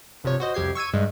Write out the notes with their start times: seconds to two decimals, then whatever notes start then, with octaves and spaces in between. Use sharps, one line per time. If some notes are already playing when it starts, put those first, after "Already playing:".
0.24 G1 C3 F3 C#5
0.40 F#4 C5 D#5
0.54 C2 F2 G4 G#6 C7
0.75 C#6 E6 G#6 D#7
0.93 G2 G#3